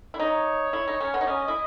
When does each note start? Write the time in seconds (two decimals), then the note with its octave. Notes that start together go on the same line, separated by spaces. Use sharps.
0.14 E4
0.20 D#4 C#5
0.73 E4
0.87 D#4
1.00 C#4
1.14 B3
1.21 D#4
1.27 C#4 D#5
1.48 E4